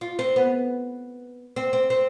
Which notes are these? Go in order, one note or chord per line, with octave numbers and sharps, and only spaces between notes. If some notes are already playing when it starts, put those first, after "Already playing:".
F4
C4
B3
C4
C4
C4